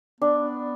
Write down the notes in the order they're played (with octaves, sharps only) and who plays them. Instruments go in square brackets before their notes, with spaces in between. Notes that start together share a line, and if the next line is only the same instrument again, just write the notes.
[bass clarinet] B3 [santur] D4